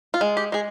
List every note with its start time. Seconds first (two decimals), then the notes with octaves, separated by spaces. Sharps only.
0.14 F4
0.21 G#3
0.37 G4
0.52 G#3 G#4